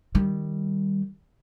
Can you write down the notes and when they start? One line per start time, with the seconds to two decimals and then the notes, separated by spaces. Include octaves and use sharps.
0.15 D#3 G3